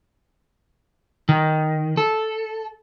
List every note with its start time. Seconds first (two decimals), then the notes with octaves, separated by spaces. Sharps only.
1.29 D#3
1.97 A4